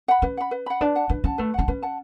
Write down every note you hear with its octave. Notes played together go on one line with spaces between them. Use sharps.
F#5 B5
C#4 B4
F#5 B5
B4
F#5 B5
D4 B4
F#5 A5
D4 B4
C#4 F#5 A5
A3 B4
C#4 F#5 A5
C#4 B4
F#5 A5